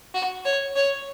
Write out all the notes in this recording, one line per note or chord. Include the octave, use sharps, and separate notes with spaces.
F#4
C#5
C#5